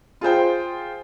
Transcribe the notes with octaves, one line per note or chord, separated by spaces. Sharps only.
F4 G#4 C5 G5